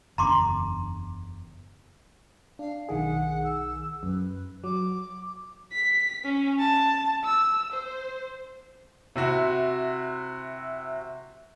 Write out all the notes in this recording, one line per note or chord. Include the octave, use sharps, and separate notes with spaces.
F#1 E2 D4 A#5 C6 D6
D4 F5
B1 D#3 G#4 F#5
E6
F#2 B4
F#3 D6
B6
C#4
A5
E6
C5
C3 E4 F#4